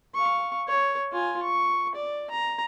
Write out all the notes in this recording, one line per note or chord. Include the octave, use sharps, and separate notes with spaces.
F5 C#6
C#5
F4 G#5
C#6
D5
A#5